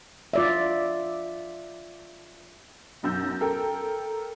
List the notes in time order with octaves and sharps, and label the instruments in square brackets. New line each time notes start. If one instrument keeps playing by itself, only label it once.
[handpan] F4 D5 E5
[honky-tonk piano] B1 F#2 E6 G6
A4 A#4 G5